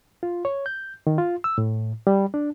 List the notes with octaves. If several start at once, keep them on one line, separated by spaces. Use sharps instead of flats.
F4
C#5
G6
D#3
F4
E6
A2
G3
D4